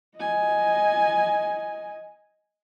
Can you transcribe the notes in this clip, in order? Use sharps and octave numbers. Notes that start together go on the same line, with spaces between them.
D#5 G#5